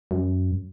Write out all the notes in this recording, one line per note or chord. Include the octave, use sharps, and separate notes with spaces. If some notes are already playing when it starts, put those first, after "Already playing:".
F#2